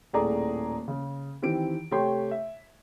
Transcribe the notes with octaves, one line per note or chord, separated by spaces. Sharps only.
D#1 A2 G#4 A4 D5 A#5
C#3
D#3 E3 C4 G4 D7
C3 A3 G4 C#5 G5 C6
E5